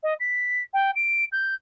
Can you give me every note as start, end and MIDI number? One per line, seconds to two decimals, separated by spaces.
0.03 0.14 75
0.20 0.62 95
0.73 0.91 79
0.95 1.24 98
1.32 1.54 91